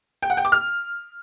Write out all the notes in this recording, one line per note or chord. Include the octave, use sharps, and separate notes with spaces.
G5
F#5
G5
D6
F6